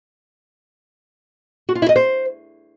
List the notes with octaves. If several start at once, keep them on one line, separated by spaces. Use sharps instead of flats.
F#4
F4
E4
D#5
C5